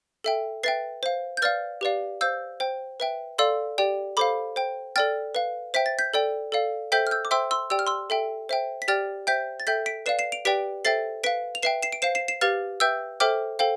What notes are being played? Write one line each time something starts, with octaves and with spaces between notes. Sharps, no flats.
A4 E5 G5
B4 E5 G5 A6 C7
C5 F5
G6
B4 D5 F5 F6 A6
G4 B4 D5 F5
C5 F5 E6 G6
C5 G5
B4 E5 G5
A4 D5 F5 C6 E6
G4 D5 G5
A4 C5 F5 B5 D6
C5 G5
A4 D5 G5 F6 A6
B4 F5
C5 E5 G5 B6
A6
G6 B6
A4 D5 G5
A4 D5 F5
A4 C5 E5 G5 G6 B6
F6
E6 G6
D6
C5 E5 G5 C6 E6
C6 E6
G4 D5 G5 E6
F6
C6 E6
A4 E5 G5
C5 E5 G5
B6
G4 D5 G5 F6 A6
C5 E5 G5 G6 B6
A6
A4 E5 G5 G6 B6
B6 D7
B4 D5 F5 C7 E7
C7 E7
D7 F7
G4 B4 D5 G5 B6 D7
A4 C5 E5 G5 A6 C7
B4 F5 B6 D7
F7
B4 E5 G5 C7 E7
C7 E7
D7
C5 F5 C7 E7
C7 E7
C7 E7
G4 B4 F5 F6 A6
B4 E5 G5 E6 G6
A4 C5 E5 G5 D6 F6
A4 C5 F5 G5